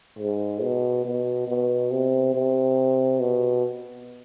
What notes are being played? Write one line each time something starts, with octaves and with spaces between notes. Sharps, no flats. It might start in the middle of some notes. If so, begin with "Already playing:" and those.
G#2
B2
B2
B2
C3
C3
B2